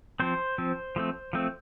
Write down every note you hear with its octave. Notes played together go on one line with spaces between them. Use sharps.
F3 C4 C5
F3 C4
F3 A3 C4
F3 A3 C4